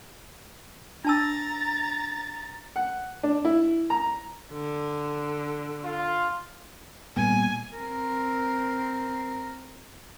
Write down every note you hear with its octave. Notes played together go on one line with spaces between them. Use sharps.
D4 A5 A#5 E6 A6
F#5
D4
E4
A#5
D3
F4
A#2 G3 B3 G#5
C4 A#4